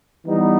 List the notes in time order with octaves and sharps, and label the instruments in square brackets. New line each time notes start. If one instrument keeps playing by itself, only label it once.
[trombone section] E3 G3 B3 D#4